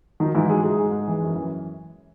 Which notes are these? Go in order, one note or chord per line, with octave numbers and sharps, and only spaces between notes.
D#3 F#3 D#4
G#2 E3 E4
F#3 G#3 G#4
G#2 G#3 G#4
G#2
G#2
E3
F#2
E3